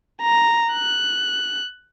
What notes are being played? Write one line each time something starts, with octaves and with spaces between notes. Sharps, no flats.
A#5
F#6